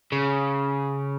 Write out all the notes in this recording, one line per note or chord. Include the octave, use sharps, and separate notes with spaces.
C#3